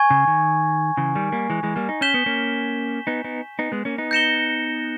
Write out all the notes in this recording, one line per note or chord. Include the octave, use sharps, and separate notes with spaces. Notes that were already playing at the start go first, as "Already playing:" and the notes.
Already playing: G#5 C#6 G#6
C#3
D#3
C#3 E3
D#3 G3
G3 A#3
E3 G#3
E3 G#3
G3 A#3
D#4
C#4 G6 B6 E7 G7
B3
A#3 C#4
B3 D#4
B3 D#4
B3 D#4
G#3 B3
A#3 C#4
B3 D#4
G6 A#6 C#7 E7 G7